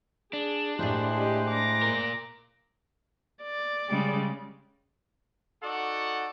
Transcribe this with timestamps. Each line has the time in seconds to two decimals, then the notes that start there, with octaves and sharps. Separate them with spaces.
0.33 D4 G#4
0.79 A2 G#3 E4 G4 C5 F#6
1.16 G4 D#5
1.48 A#5 D6 A#6
1.82 A#2 A#4
3.43 D5
3.89 C#3 G3 G#3
5.63 D#4 F#4 A4 D5 F#5 C#6